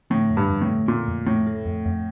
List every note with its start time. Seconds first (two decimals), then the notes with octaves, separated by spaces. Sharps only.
0.10 A2 D3
0.30 F2
0.37 G2
0.49 F2
0.62 A2
0.69 A3
0.88 A#2 A3
1.07 F2
1.27 F2 A2
1.47 A3
1.66 F2
1.85 F2